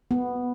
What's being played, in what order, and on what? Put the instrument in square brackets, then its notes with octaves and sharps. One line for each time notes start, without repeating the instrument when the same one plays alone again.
[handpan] B3